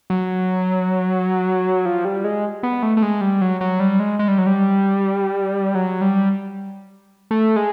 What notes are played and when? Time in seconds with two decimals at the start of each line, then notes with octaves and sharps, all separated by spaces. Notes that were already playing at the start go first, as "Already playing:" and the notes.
0.10 F#3
1.85 F3
2.05 G3
2.24 G#3
2.63 B3
2.83 A3
2.97 A3
3.02 G#3
3.21 G3
3.41 F#3
3.61 F#3
3.80 G3
3.99 G#3
4.19 G#3
4.28 G3
4.38 F#3
4.47 G3
5.75 F#3
6.01 G3
7.31 A3
7.56 G#3